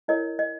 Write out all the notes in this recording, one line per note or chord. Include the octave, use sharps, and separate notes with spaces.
E4 A#4 C#5 D#5
D#5